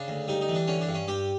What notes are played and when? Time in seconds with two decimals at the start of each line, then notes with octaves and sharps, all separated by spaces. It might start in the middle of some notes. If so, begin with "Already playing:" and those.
Already playing: C#3 D4
0.08 D2
0.28 G3 D#4
0.41 D#4
0.48 E3
0.55 D4
0.67 D3 C#4
0.81 D4
0.87 G2
0.94 C#4
1.08 G2 G4